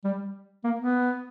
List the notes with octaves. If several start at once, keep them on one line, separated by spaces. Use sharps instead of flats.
G3
A#3
B3